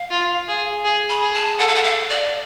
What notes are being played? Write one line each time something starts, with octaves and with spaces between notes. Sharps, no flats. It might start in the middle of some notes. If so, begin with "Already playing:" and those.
Already playing: F5
F4
G#4
G#4
B5
G#4
A5
A4 F#5
F5
F#5
F5
D5